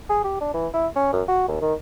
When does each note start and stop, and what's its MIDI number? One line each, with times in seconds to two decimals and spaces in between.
0.09 0.20 68
0.24 0.39 67
0.40 0.52 62
0.53 0.67 52
0.73 0.87 64
0.96 1.09 61
1.13 1.22 42
1.28 1.44 66
1.48 1.61 39
1.61 1.73 51